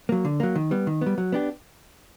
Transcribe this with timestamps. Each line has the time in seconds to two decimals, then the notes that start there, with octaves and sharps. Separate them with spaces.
0.09 F#3 A#3
0.25 D3
0.40 F#3 A#3
0.55 D#3
0.71 G3 B3
0.87 D#3
1.01 G3 B3
1.18 F#3
1.32 B3 D4 G4